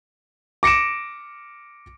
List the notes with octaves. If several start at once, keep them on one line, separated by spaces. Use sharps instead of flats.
D6 A#6 C#7 D7 E7